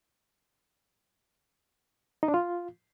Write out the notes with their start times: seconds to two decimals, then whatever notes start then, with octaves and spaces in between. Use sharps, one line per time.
2.23 D#4
2.28 D4
2.34 F4